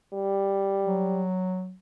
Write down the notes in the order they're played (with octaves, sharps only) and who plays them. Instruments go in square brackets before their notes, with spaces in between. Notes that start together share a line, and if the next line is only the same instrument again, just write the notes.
[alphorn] G3
[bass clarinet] F#3